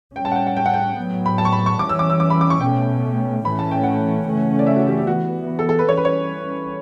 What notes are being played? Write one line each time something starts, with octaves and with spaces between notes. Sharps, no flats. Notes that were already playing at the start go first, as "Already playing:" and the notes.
A2 G3 C#4 G5
A5
F#5
G5
F#5
G5
F#5
G5
A2 F#3 B3
B5
A5
C#6
B5
C#6
E3 G3 C#4 D6
E6
D6
E6
D6
B5
D6
C#6
B2 A3 C#4 G5
A2 E3 A3 C#4 B5
A5
G5
F#5
C#3 E3 A3 C#4
D5
E5
F#4
G4
G4
E3 B3 F#4
A4
A4
B4
E3 G3 C#4 C#5
B4
C#5